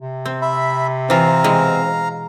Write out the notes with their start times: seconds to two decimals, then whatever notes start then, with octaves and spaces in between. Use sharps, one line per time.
0.01 C3
0.26 C4
0.42 E5 B5
1.10 E3 C4 F4 F5 A#5
1.44 B2 E3 G#3